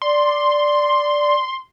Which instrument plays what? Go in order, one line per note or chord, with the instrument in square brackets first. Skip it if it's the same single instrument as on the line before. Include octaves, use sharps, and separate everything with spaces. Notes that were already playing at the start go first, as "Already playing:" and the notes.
[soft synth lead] D5 [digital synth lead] C6